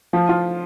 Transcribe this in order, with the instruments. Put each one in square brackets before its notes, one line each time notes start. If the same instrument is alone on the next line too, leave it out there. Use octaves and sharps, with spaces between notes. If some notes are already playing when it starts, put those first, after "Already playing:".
[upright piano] F3
F4